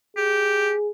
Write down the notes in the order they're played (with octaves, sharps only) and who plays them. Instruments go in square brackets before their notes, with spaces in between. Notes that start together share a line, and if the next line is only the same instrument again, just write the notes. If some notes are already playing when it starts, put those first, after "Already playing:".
[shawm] G4 [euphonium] G#4